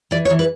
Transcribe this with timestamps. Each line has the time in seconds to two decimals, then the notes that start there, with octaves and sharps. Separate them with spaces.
0.11 E3 D5
0.25 C#5
0.30 E3
0.39 B4